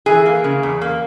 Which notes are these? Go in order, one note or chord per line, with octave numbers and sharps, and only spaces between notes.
E3 G#4
A#3
C#3
E2
A#3